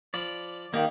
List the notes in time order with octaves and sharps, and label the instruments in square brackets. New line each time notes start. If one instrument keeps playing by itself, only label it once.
[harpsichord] F3 B5 [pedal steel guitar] D5
[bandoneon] D#3 [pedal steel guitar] A#3 G4 D5 [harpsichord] D#4 [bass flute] F5